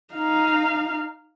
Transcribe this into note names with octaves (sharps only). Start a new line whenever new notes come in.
D#4 F5